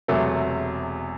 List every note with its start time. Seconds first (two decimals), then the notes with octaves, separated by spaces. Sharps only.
0.08 E1 E2 C3 F#3 A3